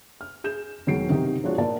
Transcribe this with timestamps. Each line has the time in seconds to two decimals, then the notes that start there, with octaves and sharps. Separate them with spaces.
0.21 F6
0.44 G#4 G6 E7
0.87 E1 D#3 F#3 G#3 C7 D7
1.09 C3 D#3 D#4 G4
1.44 F3 G#3 D4 F4 F#4 C#5
1.58 A#2 A#4 D5 A5